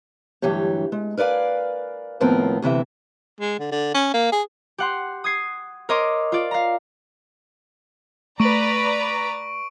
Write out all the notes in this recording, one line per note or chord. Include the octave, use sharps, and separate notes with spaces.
D2 G2 E3 F#3 G4 C#5
G#3
A#4 B4 D5 F5 G#5
D#2 A2 F3 B3 C4 A#4
D2 C3 E3 E5
G#3
D3
D3
C#4
A#3
G#4
G4 F#5 C6
D#6 G#6 C7
A#4 C#5 D#5 C6 D6
F4 D5
F5 A#5
A3 B4 D5 A#5 C#6 D7 F#7